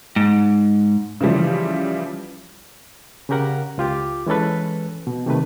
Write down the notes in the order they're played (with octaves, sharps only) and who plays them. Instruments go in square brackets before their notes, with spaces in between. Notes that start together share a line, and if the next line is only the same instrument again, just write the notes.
[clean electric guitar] G#2
[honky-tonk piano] C#3 E3 F3 G3
[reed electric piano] C#3 C#4 G4 A#4 F#5
C#2 F4 G4 D6
E3 G#3 C#4 A4 B4
B2
C3 D#3 A3 B4